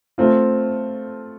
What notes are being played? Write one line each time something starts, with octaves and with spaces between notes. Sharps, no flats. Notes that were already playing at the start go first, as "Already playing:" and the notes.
A3 C4 F4